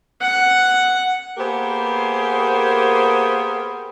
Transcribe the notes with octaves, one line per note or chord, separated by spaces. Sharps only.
F#5
A#3 B3 G4 G#4 A#4 C5